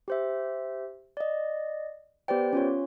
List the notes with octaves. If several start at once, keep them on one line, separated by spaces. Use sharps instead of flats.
G4 C5 E5
D5 D#5
B3 G4 B4 C5 D5 G5
C#4 F4 C#5